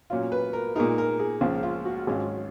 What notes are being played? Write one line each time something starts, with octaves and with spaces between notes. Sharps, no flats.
A#2 F#3 C#4 F4
B4
A#4
A#2 G#3 D#4 A#4
A#4
G#4
C#2 C#3 F3 A#3 F4
F4
F#4
G#1 G#2 F#3 C#4 F4 G#4